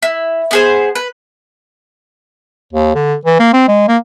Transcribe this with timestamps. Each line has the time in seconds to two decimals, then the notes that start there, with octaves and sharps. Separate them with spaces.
0.03 E4
0.51 B3 G#4 C5
0.95 B4
2.73 D#2
2.95 D3
3.25 E3
3.40 A#3
3.53 C4
3.68 G#3
3.88 A#3